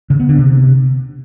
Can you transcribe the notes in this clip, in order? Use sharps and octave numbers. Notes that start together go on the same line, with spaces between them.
C#3
B3
D3
C3